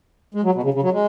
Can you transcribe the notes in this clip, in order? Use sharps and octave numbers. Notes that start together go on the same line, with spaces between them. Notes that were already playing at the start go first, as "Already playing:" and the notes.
G#3
F#3
B2
C#3
C#3
F#3
G#3